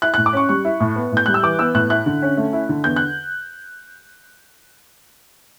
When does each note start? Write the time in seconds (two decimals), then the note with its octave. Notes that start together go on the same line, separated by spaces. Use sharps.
0.02 E4 F#6
0.14 A2 F#6
0.26 D6
0.33 C#4 C#6
0.49 G3 C#6
0.65 E4
0.80 A2
0.96 B3
1.12 A2 G6
1.26 G3 F#6
1.34 E6
1.43 E3 D6
1.59 B3 E6
1.74 A2 F#6
1.90 E4 F#6
2.06 D3
2.22 C#4
2.37 A3
2.53 E4
2.69 D3
2.84 E2 G6
2.96 F#6